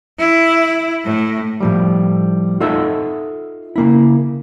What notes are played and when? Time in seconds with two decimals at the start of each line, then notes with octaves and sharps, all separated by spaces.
0.18 E4
1.04 A2
1.61 A2 F3 G3
2.60 D#4 F4 A4 D#5 E5 F#5
3.76 C#3 A#3 E4